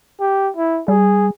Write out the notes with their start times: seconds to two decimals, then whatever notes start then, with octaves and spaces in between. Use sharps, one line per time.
0.21 G4
0.57 E4
0.88 G3 G#4